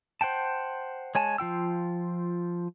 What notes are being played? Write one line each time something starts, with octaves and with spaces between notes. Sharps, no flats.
C5 F#5 G5 A5
G#3 C#5 G#5 A5
F3 F4 G5 E6